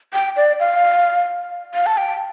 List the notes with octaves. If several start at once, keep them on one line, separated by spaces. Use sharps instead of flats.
G5
D5
F5
F5
A5
G5